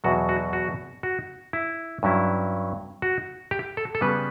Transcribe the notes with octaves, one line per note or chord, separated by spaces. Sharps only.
E2 B2 F#3 F#4
F#4
F#4
F#4
E4
G2 F#3 C#4 E4
F#4
G4
A4
A4
C#3 G3 B3 B4